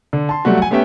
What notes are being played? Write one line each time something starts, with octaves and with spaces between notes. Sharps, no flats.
D3
A5 C6
F#3 G3 A3 F#4
F#5 G#5
A3 B3 C#4 G4 E5 G5